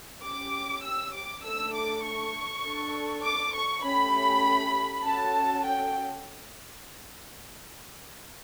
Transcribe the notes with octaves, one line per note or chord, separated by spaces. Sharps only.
C#4 G4 D6
E6
D6
A3 D4 A4 E6
D6
C#6
D4 A4
D6
C#6
A3 C#4 G4 B5
C#4 F#4 A4 A5
G5